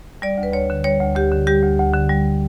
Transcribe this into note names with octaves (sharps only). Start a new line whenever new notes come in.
G3 D5
D2
B4
D2 C#5
D3
G3 C#5
D2
D2 G4
D3
G3 G4
D2
D2
D3
G3